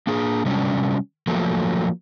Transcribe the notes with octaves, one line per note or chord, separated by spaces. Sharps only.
A#3 D4 G#4
C3 F#3 G3 C#4 D4
F3 F#3 A3 A#3